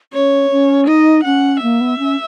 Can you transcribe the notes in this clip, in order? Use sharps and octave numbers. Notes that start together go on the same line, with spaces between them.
C#4 C#5
C#4
D#4 D#5
C#4 F#5
A#3 E5
B3
C#4